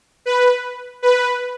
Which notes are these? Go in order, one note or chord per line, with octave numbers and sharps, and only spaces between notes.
B4
B4